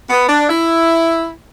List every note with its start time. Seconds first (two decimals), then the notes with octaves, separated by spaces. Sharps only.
0.10 B3
0.28 D4
0.48 E4